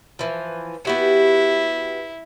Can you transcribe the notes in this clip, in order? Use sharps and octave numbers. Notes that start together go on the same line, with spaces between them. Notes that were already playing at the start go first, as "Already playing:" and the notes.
E3 F3
B3 E4 F#4 G4